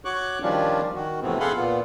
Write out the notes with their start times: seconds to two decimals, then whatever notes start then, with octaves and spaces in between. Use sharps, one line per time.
0.05 F#4 C#5 C#6 D6 F#6
0.42 D#3 F3 G3 C#4 D4 F4
0.94 D#3 F#4
1.22 F2 A2 C3 E3 B3 C4
1.40 G#4 A4 F5 F#5 B5 C6
1.56 A#2 B3 F4